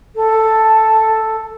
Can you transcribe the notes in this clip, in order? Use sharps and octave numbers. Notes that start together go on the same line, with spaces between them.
A4